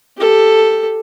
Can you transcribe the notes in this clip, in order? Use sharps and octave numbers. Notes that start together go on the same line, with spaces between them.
G4 A4